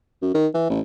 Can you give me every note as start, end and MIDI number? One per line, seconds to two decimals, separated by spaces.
0.22 0.31 42
0.34 0.47 51
0.54 0.65 52
0.70 0.80 33